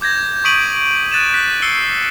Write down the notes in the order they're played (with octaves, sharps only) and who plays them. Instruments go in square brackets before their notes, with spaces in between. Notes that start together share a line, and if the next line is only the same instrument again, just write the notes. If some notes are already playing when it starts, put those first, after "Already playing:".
[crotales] D6 G6 G#6 A#6
C#6 D#6 B6 D7 D#7 F#7
F#6 A6 D#7 E7
F#6 B6
E6 C7 C#7 G7